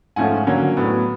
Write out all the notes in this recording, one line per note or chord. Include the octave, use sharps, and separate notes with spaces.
G#2 F3 A3 C#4 F#5 G#5
D3 F#3 A#3 C#4
A2 F#3 B3